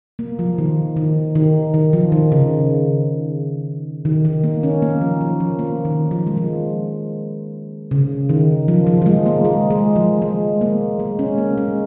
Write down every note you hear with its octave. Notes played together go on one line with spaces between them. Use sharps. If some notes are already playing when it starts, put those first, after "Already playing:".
A#3
F3
D#3
D#3
D#3
D#3
F3
D#3
C#3
D#3
D#3
A#3
C#4
A#3
F3
F3
F3
A#3
D#3
F3
G#3
F3
C#3
D#3
F3
F3
F3
G#3
A#3
G#3
G#3
F3
G#3
A#3
G#3
C#4
A#3
G#3